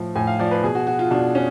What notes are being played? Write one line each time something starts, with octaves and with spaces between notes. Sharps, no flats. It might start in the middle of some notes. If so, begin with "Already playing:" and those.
Already playing: A2 F3
A2 G#5
F5
F3 D5
B4
B2 G#4
F#4
F#4
F4
B2 D4
C#4